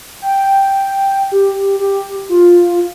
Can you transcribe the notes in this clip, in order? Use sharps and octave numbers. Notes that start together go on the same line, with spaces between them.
G5
G4
G4
F4